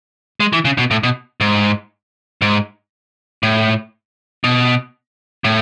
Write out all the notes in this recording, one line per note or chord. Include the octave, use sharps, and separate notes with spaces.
G#3
E3
C#3
B2
A2
B2
G#2
G#2
A2
B2
A2